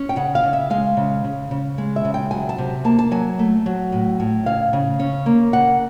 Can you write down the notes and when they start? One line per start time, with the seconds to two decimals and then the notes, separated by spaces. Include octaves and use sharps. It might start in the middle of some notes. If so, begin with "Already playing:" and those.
Already playing: C#4
0.09 G5
0.16 C#3 F#5
0.35 F5
0.43 C#3
0.53 E5
0.70 G#3 F5
0.97 C#3
1.24 C#3
1.51 C#3
1.78 G#3
1.96 E5
2.05 C#3
2.14 G5
2.31 F#3 G#5
2.49 A5
2.58 C3
2.85 A#3 A5
2.99 A5
3.11 F#3 G#5
3.39 A3
3.66 F#3
3.92 A2
4.20 A2
4.46 C#3 F5
4.73 C#3
4.99 C#4
5.26 A#3
5.53 C#3 F#5